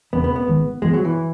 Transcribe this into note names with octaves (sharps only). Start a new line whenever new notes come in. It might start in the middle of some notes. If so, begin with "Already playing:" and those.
E1 E2 C#3 B3
B3
B3
G#1 G#2 D#3 G#3
F#2 E3 G#3 B3
F#3
E3